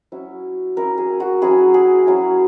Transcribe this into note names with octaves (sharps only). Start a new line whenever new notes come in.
F#3 C#4 E4
F#3 C#4 E4 A#4
G#4
F#4
F#3 C#4 E4 G#4
G#4
F#3 C#4 E4